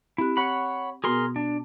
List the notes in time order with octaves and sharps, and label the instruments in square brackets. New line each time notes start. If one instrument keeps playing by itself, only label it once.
[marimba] C4 G4 F#6 [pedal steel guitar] E4
[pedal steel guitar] C#5 F#5 B5
[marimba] B2 B3 F#4 [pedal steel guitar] G#4 A#4 C6
[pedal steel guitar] D4